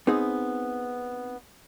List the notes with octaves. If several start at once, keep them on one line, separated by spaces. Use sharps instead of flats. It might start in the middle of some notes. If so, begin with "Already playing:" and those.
B3 C4 D#4 G#4